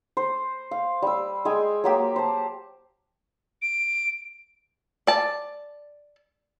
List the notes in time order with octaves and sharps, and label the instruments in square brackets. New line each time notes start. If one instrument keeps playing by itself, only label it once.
[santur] C5
F5
G3 E6
G#3 G5 G#5
F#3 A#3 G4
C5 A5
[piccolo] D7
[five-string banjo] D5 A5